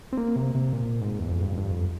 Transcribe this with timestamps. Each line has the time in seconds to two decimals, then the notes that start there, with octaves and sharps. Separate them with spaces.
0.13 C4
0.17 A#3
0.36 C3
0.55 C3
0.73 A#2
1.01 G#2
1.19 E2
1.29 F2
1.42 G2
1.52 F2
1.57 G2
1.71 F2